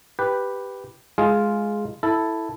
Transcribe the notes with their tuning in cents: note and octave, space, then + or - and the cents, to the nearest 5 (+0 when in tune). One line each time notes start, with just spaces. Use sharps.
G4 +0 B4 +0
G#3 +10 F4 +0 G#4 +15
E4 +0 A4 +0